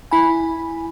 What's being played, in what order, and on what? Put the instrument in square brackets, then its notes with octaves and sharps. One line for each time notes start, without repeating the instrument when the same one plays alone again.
[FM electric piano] E4 G#5 [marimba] B5